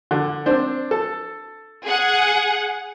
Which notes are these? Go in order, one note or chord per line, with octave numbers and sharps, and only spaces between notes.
D3
C4 D4 C5
A4
G#4 F#5